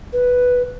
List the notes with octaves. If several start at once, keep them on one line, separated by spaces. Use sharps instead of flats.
B4